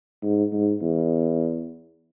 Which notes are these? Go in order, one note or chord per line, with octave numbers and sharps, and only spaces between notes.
G#2
G#2
E2